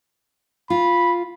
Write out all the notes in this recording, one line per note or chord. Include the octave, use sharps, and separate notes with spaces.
F4 B5